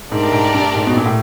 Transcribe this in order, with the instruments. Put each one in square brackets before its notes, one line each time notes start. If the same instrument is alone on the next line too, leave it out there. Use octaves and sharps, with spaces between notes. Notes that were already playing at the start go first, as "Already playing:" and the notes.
[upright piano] G#2 [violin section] A3 D4 G4 A#4 D5
[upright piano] G#2
G2
G#2
B2
A#2
A2